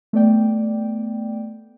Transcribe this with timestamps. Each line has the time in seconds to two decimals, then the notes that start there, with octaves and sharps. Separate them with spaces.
0.13 A3 B3 D5 G5